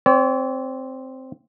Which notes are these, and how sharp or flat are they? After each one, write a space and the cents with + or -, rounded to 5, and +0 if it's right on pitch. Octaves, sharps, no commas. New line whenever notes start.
C4 +0 C#5 +45